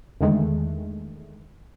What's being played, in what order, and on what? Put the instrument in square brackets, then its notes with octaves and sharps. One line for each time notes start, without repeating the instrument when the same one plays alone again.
[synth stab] E2 D3 D#3 G#3 A3